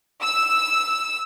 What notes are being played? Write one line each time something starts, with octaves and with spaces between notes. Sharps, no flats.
E6